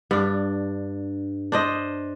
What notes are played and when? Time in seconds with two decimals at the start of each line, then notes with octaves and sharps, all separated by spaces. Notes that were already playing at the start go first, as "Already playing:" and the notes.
0.11 G2 D4
1.52 D4 C5 D#5